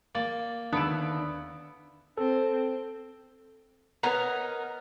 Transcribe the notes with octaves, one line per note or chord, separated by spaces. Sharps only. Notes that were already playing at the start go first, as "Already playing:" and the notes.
A#3 D5
D#2 D3 B3 D4 E4 D7
C4 A4
B3 D#4 A#4 B4 C#5 A#5